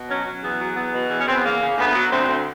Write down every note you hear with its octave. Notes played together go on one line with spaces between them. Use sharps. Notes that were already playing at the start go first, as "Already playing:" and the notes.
Already playing: B2
F#3 C#4
F#3
E2 B3
F#3
E2 B3
B2
E2
C#4
E2 C4
B3
C#3 A#3
C#3
D2 B3
F#3
D2 C4
D2